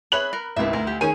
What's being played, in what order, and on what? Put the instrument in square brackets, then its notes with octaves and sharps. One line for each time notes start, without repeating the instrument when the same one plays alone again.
[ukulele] G#4 C#5 E5 [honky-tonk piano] B5 F#6 F#7
[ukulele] A#4
[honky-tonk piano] G#1 C#2 [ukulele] E4 G4 E5
[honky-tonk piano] D2 [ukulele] A#4
[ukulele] G4
[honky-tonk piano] D#3 G#4 D#7 [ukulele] C#4 C#5 G#5